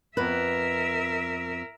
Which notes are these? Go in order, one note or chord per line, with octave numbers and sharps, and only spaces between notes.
F2 B3 A#4 B4 E5